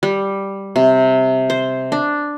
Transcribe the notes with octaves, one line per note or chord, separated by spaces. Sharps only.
G3
C3
C5
D4